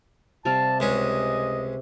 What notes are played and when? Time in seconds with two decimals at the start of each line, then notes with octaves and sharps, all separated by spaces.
0.45 C3 G3 F5 A5
0.80 C#2 G#3 C#4 D#5